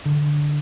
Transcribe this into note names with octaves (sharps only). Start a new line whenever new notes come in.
D3